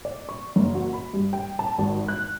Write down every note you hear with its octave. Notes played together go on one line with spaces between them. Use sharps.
D5
C#6
F#1
F#4
B5
G2
G5
A5
G#1
F#6